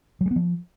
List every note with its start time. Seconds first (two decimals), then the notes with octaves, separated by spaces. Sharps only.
0.21 F#3
0.26 G#3
0.31 B3
0.36 F3